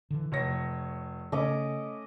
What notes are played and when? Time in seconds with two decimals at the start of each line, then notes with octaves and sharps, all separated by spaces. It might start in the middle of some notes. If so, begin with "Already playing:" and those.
0.11 D3 E3
0.32 F1 C3 C#5 A#6
1.32 C#3 A3 C#4 D#5 D6